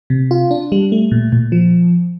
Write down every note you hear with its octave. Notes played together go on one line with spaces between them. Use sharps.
C3
F4
D4
G3
A3
A#2
A#2
F3